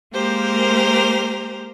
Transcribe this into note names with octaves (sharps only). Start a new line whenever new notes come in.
G#3 A#3 G4 A#4 C5